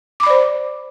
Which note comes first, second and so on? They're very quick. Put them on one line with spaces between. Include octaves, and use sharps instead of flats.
D6 B5 D5 C5